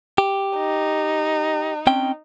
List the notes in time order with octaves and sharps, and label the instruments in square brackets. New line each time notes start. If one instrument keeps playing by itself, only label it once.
[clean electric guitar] G4
[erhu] D#4
[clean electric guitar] C4 C#4 G5